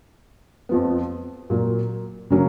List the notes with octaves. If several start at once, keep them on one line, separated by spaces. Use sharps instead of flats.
F2 F3 B3
A#2 F#3 A#3
C#3 F#3 A#3 C#4